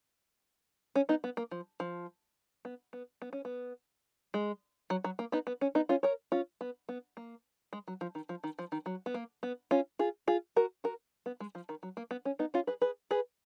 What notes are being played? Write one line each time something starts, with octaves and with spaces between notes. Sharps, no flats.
C#4
B3 D#4
B3
A#3
F3
F3
B3
B3
B3
C#4
B3
G#3
F#3
F#3
A#3
B3 D#4
B3
C#4
B3 D#4
C#4 F4
A#4 C#5
C#4 F4
B3
B3
A#3
G#3
F#3
F3
D#3
F3
D#3
F3
D#3
F#3
B3
A#3
B3
C#4 F4
F4 G#4
F4 G#4
F#4 A#4
F#4 A#4
B3
G#3
F3
D#3
F#3
A#3
B3
C#4
B3 D#4
C#4 F4
G#4 B4
G#4 B4
G#4 B4